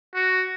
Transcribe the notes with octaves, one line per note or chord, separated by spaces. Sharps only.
F#4